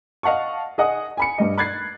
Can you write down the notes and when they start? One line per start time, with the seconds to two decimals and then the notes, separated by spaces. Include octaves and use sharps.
0.23 D#5 F5 F#5 A5 C#6
0.78 G#4 D#5 F#5 D#6
1.17 G#5 B5 C#7
1.38 G2 G3 D#5
1.58 B5 F#6 G#6 A6 C7